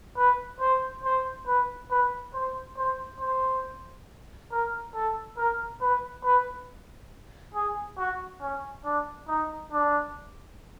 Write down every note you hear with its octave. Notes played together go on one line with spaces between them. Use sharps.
B4
C5
C5
B4
B4
C5
C5
C5
A#4
A4
A#4
B4
B4
G#4
F#4
C#4
D4
D#4
D4